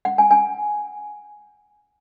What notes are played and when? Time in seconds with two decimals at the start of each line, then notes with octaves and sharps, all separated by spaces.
0.05 F#5
0.18 G#5
0.31 G#5